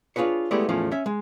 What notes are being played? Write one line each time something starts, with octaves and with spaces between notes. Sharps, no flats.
D4 F4 F#4 G#4 B4 C#5
G#3 A3 B3 E4 G4 D5
E2 A2 F3 A3 C#4
C#4 E5
G#3